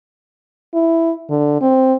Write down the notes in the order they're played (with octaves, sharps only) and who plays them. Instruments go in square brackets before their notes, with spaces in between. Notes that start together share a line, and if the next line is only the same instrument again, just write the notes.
[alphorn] E4
D3
C4